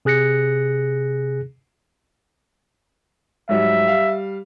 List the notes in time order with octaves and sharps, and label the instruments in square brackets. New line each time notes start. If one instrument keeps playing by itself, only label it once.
[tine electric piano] C3 G#4 F#6 A#6 C#7
[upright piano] G#2 F#3 G3 [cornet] E5
[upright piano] G3 F5